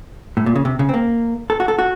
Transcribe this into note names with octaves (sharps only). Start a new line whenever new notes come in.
A2
A#2
C#3
C3
C#3
C4
A#3
A4
F#4
A4
F#4